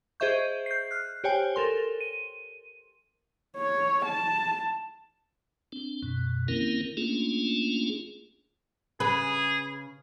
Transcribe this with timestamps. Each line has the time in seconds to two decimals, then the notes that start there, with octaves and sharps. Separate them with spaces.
0.20 G#4 C5 D#5 E5 C#6 G6
0.66 G6 C7
0.91 F6 F#6
1.24 G4 C5 C#5 G5 G#5
1.55 A4 A#4 C6 G7
2.00 D#7
3.57 C#5
4.06 A5
5.72 C4 D4
6.03 F#2 B2
6.48 D#3 A#3 C4 C#4 E4 A#4
6.97 A3 A#3 C#4 D4 F4 G#4
9.00 C#3 G#4 B4